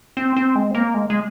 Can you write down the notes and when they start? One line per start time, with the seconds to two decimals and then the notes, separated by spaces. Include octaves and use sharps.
0.17 C4
0.37 C4
0.56 G#3
0.71 C4
0.75 A#3
0.94 G#3
1.10 G#3